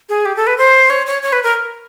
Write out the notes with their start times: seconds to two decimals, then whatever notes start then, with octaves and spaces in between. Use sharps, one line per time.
0.09 G#4
0.25 G4
0.36 A4
0.47 B4
0.58 C5
0.90 C#5
1.07 C#5
1.23 C#5
1.33 B4
1.43 A#4